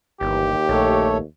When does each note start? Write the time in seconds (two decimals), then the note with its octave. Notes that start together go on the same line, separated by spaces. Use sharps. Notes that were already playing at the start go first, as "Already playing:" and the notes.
0.21 G1 D#2 E3 G4
0.69 A#1 A3 A4 C#5